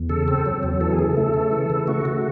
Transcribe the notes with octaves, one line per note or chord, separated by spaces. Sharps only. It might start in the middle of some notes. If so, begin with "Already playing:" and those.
Already playing: E2
C#3 A4
C4 A4
F#3
E2
E3 A4
G#4
C#3
A4
A3
C#3
E3
C#3
A3 F#4
C#3